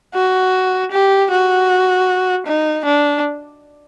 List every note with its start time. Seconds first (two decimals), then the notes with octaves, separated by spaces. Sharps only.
0.15 F#4
0.91 G4
1.31 F#4
2.46 D#4
2.85 D4